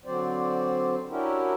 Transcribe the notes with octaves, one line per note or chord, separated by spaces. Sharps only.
D3 F#3 C4 C5 D5
C#4 D4 E4 F#4 G4 A#4